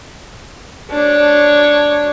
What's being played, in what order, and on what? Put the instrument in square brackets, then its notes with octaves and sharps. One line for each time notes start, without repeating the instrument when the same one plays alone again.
[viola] D4 C#5